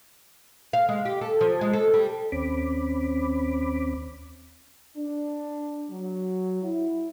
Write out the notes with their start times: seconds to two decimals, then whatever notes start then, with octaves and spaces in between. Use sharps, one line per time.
0.73 F5
0.89 G#3
1.05 G4
1.21 A4
1.41 F3
1.61 G#3
1.73 A4
1.94 G3
2.32 D#2 C4 C#4 B5 D6
4.97 D4
5.90 F#3
6.63 E4